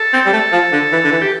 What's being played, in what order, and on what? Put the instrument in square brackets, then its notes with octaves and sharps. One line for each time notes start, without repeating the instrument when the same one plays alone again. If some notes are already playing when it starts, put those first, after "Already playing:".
Already playing: [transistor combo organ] A4
[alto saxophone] C4
G3
A3
F3
D3
E3
D3
E3
[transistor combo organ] G4